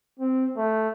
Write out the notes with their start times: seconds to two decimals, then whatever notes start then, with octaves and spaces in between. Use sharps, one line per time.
0.20 C4
0.57 A3